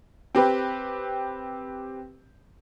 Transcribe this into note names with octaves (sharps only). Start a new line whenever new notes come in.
C4 G4 B4